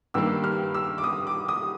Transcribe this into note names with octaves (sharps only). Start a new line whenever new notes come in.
G2 D#3 G3 A#3 E6
F6
E6
D6
D#6
D6
D#6